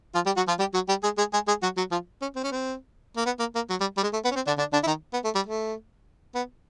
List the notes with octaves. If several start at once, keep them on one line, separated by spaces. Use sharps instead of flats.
F3 F4
G3 G4
F#3 F#4
F3 F4
G3 G4
F#3 F#4
G3 G4
G#3 G#4
G#3 G#4
G#3 G#4
G#3 G#4
F#3 F#4
F#3 F#4
F3 F4
C#4
C4
C#4
C4
A#3
B3
A#3
A#3
F#3
G3
G3
G#3
A3
B3
C#4
C4
D3 D4
D3 D4
D3 D4
E4
D#3 D#4
B3
A3
G3
A3
B3